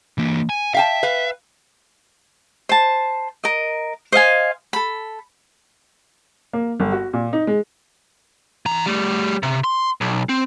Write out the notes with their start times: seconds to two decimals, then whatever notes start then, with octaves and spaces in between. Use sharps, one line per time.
0.18 E3 A#3
0.49 G#5
0.74 E5 F5 G5 A5
1.03 B4 F5
2.69 C5 A5
3.44 A#4 D#5
4.12 C5 D#5 F5 G#5
4.73 A4 B5
6.53 A#3
6.80 G1
6.92 F#4
7.13 A#2
7.33 D#4
7.47 G#3
8.66 E3 A#5
8.86 G3 A3
9.43 C3
9.64 C6
10.01 B1
10.29 C4